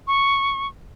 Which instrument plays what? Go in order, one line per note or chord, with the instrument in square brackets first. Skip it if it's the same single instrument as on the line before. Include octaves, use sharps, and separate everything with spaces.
[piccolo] C#6